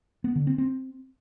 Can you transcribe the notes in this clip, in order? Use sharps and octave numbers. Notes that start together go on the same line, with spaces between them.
B3
D3
C4
C4